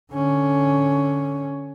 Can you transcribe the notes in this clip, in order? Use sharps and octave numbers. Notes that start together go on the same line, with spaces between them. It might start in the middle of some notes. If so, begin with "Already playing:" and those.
D3 C#4